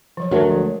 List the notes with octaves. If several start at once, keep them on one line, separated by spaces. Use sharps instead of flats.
F3 F#3 C#5
D2 F#3 A3 A#4 E5 A5
F3 G#3